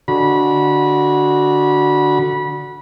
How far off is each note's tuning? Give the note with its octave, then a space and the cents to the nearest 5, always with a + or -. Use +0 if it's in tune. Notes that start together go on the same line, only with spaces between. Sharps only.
D3 +0 F#4 +0 B5 -25